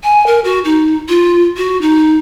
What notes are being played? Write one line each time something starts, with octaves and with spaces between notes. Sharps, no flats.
G#5
A#4
F#4
D#4
F4
F#4
D#4